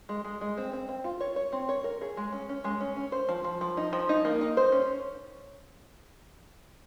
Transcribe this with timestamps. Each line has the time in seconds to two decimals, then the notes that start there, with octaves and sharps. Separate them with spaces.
0.09 G#3
0.25 G#3
0.41 G#3
0.57 C4
0.73 C4
0.89 C4
1.04 F4
1.20 C#5
1.36 C#5
1.53 C4
1.69 C#5
1.84 A#4
2.01 G#4
2.17 G#3
2.33 C#4
2.49 C#4
2.64 G#3
2.81 C#4
2.97 C#4
3.12 C5
3.29 F3
3.44 F3
3.61 F3
3.77 D#4
3.93 F3
4.09 D#4
4.25 A#3
4.41 D#4
4.57 C5
4.72 C#4